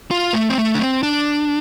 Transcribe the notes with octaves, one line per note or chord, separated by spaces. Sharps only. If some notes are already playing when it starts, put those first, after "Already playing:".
F4
A3
C4
A3
D4
C4
D4